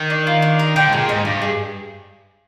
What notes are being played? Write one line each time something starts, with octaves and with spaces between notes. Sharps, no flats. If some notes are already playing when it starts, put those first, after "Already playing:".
Already playing: D#3
D4
F4
D4
A#4
D3 G5
G#2
A#2 G#4
G#2 D#5
G2 D#5
G#4